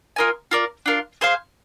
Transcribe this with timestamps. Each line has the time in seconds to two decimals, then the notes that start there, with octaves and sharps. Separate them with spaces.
0.16 F4 A#4 D#5 G#5
0.51 F4 A#4 D5
0.86 D4 F4 A#4
1.21 G#4 C5 F5